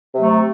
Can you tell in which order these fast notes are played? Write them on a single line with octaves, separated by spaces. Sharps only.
C3 F#3 A3